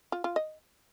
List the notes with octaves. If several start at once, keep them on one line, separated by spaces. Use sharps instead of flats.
F4
F4
D#5